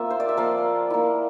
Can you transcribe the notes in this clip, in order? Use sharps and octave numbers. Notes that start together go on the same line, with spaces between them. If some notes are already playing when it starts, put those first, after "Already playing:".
Already playing: A#3 C4 F4 E5
C5
D5
E5
F3 A#3 F4 F5
A#3 E4